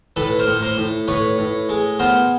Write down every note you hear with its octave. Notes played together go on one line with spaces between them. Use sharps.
A2 A4 B4
A#4 C5
A2
A#4 C5
A2
A2 B4 C#5
A2
G#3
B3 A#4 C5